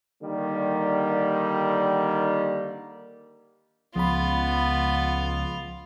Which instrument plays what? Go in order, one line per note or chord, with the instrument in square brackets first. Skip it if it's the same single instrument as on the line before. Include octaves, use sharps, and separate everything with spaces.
[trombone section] D3 D#3 G3 A#3
[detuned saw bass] C#2 [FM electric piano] F3 B5 [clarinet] B3 [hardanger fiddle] F4